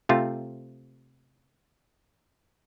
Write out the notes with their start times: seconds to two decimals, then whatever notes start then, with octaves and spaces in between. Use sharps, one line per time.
0.09 C3 A3 C4 F4